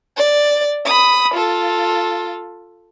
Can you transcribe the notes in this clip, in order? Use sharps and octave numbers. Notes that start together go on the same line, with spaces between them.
D5
B5 D#6
F4 A4